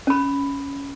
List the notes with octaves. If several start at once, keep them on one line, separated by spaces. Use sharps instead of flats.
C#4 B5